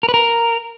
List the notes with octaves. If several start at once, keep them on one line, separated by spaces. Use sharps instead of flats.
A#4
B4
A#4